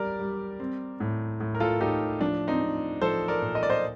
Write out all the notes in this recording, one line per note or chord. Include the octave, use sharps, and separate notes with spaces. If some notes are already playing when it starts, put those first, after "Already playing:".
Already playing: G3 G4 A#4 D5
G3
C4
A2
A2
A#4
F4 A4
A2 D#4 G4
F3 D4
C4 D#4
C4
F3 A4 C5
A#4 D5
A#2
D#5
D5
C5 D#5